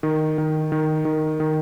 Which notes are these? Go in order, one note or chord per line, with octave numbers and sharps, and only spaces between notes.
D#3
D#3
D#3
D#3
D#3